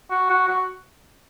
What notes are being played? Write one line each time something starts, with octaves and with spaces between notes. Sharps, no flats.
F#4
F#4
F#4